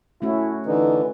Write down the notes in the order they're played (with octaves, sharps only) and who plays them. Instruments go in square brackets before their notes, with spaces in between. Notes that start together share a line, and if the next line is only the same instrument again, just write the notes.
[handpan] A3 C#4 F#4 [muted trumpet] E4
[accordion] D3 E3 [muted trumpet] D#4